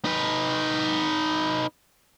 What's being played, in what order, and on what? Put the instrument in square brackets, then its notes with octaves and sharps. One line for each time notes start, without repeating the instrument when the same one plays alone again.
[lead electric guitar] D#4 B4